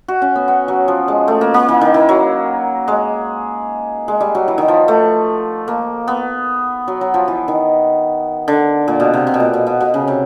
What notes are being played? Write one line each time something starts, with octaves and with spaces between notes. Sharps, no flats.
F#4
C#4
B3
B3
F#3
F3
G#3
A3
A#3
A#3
E3
D#3
E3
F#3
G#3
G#3
G3
F#3
E3
D#3
F3
A3
A#3
B3
F#3
F#3
F3
E3
D#3
D3
A#2
B2
C3
C3
B2
A#2
B2
B2
B2
C#3
C3